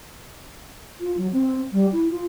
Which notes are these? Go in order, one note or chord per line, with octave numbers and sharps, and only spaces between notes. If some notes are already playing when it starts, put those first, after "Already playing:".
F4
F#3
C4
G3
E4
F4